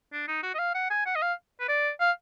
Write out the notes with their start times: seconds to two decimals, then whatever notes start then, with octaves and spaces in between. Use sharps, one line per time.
0.13 D4
0.28 D#4
0.43 F#4
0.55 D#5
0.59 F5
0.75 F#5
0.90 G#5
1.06 F#5
1.15 D#5
1.22 F5
1.60 B4
1.68 D5
2.00 F5